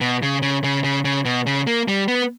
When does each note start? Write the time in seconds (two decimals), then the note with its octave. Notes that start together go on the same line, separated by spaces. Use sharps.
0.01 B2
0.23 C#3
0.42 C#3
0.64 C#3
0.84 C#3
1.05 C#3
1.25 B2
1.46 C#3
1.67 A#3
1.88 G3
2.08 B3